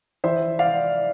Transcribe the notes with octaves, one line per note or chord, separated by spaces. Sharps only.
E3 C5 E5
D5 F5